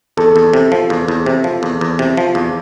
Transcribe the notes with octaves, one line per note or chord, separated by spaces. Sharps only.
E2 A4
E2
C3
F3
E2
E2
C3
F3
E2
E2
C3
F3
E2